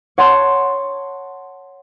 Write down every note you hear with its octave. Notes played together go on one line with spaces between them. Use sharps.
C#5 F#5 A5 C6